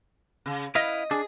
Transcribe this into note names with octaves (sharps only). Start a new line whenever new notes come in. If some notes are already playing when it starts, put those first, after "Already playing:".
C#3
E4 B4 D#5 F5
D4 G#4